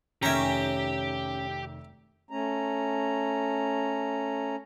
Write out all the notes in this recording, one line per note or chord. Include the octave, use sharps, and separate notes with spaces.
F1 D#3 C#4 G4 E5 G5 A#5 C7
A3 C#4 A#5